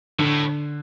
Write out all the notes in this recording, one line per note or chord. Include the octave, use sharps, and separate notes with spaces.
A2 D3